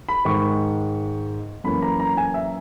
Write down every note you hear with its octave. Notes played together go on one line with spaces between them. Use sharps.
B5
G#2 D#3 G#3 C#6
F#2 E3 A#3 C#4 B5
A#5
A#5
G#5
E5